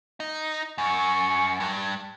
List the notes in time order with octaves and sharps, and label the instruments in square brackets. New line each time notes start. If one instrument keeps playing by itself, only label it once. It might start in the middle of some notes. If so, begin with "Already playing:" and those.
[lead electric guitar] D#4
[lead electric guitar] F#2 [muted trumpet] C#6
[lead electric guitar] G2